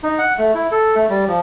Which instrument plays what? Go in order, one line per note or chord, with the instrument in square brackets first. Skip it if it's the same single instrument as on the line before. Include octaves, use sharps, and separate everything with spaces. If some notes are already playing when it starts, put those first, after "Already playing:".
[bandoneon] D#4
F#5
A3
E4
A4
A3
G3
F3